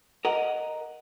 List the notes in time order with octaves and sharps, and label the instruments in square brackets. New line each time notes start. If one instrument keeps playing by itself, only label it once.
[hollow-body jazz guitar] A#4 D#5 F#5